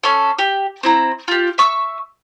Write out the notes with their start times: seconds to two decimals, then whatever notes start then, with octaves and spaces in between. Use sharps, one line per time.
0.03 C#4 A4 C6
0.39 G4
0.83 C4 E4 A#5
1.28 F4 G4
1.58 E5 C#6 E6